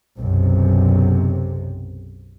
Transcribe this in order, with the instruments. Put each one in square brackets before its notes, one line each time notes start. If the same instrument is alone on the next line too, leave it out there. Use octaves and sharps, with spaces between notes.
[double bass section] B1 F#2 C3